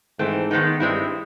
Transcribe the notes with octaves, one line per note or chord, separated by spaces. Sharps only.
G#2 E3 A3 C4
D#3 G#3 B3 D#4
G2 G#3 C4 E4